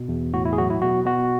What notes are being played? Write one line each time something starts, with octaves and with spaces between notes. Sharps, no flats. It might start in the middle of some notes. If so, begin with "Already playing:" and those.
Already playing: B2
E2
A2 F#4
E4
G#4
F#3 F#4
E4
B2 F#4
B2 F#4